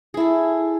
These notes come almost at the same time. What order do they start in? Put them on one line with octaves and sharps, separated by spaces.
G#4 E4 A4